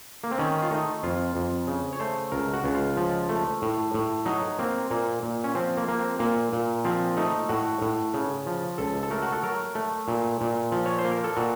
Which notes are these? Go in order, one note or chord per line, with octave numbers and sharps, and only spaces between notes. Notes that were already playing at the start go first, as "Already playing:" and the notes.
A#3
C4
D#3 C#4
F4
A3 D#4
F2 F4
F2
C#3
C#5
A3 C5
C#2 A#4
F#4
C#2
F4
F3
A3
A2
A2
F#3 D#4
A#3 C4
A#2 A#3
A#2
C#4
F3 C4
A#3
A#3
C4
A#2 A#3
A#2
F3 C4
A3 D#4
A2 F#4
A2
C#3
F3
C#2 A4
A4
A3 A#4
F#4
A4
F#3 A#4
A3
A#2
A#2
F3
C#5
C5
A#3
A#4
A4
A#2 F#4